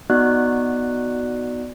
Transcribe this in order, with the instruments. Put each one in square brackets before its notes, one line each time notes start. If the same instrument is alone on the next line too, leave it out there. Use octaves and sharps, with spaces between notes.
[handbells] B3 D#4 F#4 D5 F#6